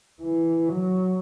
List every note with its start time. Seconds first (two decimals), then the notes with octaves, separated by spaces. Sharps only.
0.22 E3
0.69 F#3